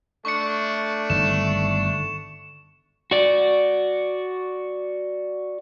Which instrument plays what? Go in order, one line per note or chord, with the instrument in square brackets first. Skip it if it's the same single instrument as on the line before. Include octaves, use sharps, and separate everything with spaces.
[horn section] A3 D4 [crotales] C#6 C#7
[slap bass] G1 D#3 [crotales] E7
[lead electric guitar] F#4 D5